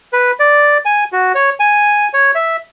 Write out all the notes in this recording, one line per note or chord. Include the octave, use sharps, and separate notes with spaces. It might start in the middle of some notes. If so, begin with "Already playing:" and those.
B4
D5
G#5
F#4
C#5
G#5
C#5
E5